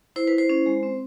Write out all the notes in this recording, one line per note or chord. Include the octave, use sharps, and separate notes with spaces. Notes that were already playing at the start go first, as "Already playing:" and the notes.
E4 C5
B4
E4
C5
C#4
G#3
C4